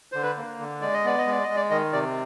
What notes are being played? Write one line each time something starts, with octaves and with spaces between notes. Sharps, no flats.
D3 C5
B4
A#3
D3
G#3 D5
D#5
B3 D5
D#5
G#3 D5
D#5
G#3
D5
D#3 D#5
C3 D5